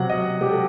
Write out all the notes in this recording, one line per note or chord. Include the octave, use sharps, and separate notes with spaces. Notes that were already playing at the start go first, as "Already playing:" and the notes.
Already playing: C3 F#3 F#5
D#5
F#3 G4
A4